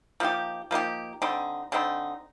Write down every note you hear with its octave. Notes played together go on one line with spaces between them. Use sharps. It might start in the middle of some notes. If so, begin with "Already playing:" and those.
F3 A#3 D#4 G4
F3 A#3 D#4 G4
D3 G3 C4 D#4
D3 G3 C4 D#4